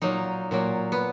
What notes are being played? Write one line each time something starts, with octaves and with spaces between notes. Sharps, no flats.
A#2 F#3 A#3 D#4
A#2 F#3 A#3
B3